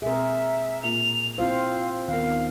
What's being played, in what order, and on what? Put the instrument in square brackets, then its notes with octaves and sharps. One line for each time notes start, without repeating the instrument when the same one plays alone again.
[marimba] B2 C4 [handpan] G#4 A#4 [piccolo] E5
[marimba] A#2 A#3 F4 [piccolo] F7
[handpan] C4 F4 C5 [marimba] E4 [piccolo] F5
[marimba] D#2 B3 A#4 [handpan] D#3 [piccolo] F5